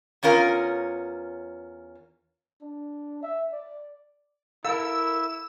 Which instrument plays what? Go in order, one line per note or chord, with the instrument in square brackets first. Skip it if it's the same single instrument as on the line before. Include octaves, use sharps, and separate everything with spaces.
[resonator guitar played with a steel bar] E2 C#4 F4 A#4
[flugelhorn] D4
E5
D5
[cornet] E4 [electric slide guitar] A4 A#4 [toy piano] F5 [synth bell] E6